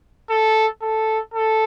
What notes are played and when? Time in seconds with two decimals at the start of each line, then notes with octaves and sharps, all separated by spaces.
0.30 A4
0.82 A4
1.34 A4